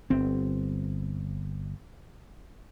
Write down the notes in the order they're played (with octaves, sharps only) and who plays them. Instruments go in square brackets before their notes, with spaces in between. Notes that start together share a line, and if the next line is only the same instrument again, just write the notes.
[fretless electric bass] G1 C4